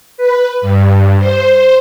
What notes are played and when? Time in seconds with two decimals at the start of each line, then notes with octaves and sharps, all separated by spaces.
0.17 B4
0.61 G2
1.18 C5